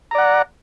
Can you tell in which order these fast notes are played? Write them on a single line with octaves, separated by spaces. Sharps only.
A#5 D5 F#5